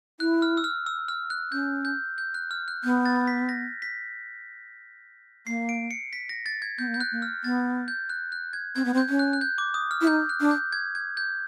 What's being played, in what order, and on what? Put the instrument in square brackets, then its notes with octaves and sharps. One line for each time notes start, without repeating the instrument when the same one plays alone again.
[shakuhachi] E4 [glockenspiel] F#6
[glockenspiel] F6
E6
F6
E6
F6
F#6
[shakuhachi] C#4 [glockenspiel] G6
[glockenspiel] G6
G6
F#6
F6
F#6
[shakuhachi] B3 [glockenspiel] G6
[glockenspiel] A6
B6
A#6
B6
[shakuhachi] A#3 [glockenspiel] C7
[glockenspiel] D7
C#7
B6
A#6
A6
G#6
[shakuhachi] B3 [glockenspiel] G6
[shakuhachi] A#3
[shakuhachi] B3 [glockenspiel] G6
[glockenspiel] F#6
[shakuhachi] A#3
[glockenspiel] F6
[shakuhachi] B3 [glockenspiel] A6
[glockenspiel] G6
F#6
F#6
G#6
[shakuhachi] C4 [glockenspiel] G#6
[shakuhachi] B3
C4
[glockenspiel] G6
[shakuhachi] C#4
[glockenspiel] F#6
F#6
G6
D6
D#6
F6
[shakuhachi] E4
[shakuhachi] D#4 [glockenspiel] G6
[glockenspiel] F#6
[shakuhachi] D4
[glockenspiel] G6
G#6
G#6
G6